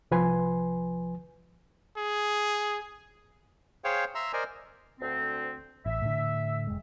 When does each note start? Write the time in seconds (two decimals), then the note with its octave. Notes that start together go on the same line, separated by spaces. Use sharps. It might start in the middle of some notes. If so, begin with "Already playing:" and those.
0.11 C2 F3 B4 G#5 C6
1.97 G#4
3.84 G#4 C5 C#5 F5 G5
4.15 E5 A#5 C6 E6
4.33 A#4 C5 D5 D#5 G#5
5.00 D2 C4
5.86 A1 E5
6.02 A2 D3
6.67 F1 G#3